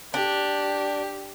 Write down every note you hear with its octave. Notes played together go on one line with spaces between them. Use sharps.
D4 G4